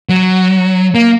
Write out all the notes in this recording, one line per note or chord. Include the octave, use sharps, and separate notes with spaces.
F#3
A#3